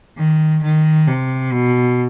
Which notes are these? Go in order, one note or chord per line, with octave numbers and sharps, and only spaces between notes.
D#3
D#3
C3
B2